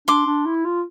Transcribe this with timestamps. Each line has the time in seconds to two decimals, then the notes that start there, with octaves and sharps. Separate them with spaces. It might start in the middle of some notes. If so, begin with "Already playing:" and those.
0.08 D4 C6 D6
0.26 D4
0.46 E4
0.65 F4